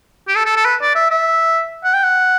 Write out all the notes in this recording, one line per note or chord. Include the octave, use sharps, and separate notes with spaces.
G4
A4
A4
A4
B4
D5
E5
E5
F#5
G5
F#5